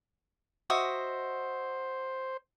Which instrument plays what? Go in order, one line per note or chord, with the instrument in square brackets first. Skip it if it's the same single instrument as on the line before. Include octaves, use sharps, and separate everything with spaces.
[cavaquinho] F#4 D#5 E5 [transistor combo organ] C5